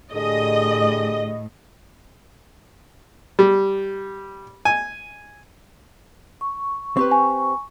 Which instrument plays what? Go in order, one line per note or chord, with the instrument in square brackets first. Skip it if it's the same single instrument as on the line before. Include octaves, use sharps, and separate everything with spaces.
[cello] A2 [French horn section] D3 G4 G#4 [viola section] D#5
[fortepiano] G3
G#5
[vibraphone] C#6
[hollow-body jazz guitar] C4 G4 B4 [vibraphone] C#6
[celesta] G#5